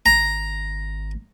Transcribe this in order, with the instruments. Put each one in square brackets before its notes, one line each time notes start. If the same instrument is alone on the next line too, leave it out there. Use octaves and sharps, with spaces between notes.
[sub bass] G#1 [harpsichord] A#5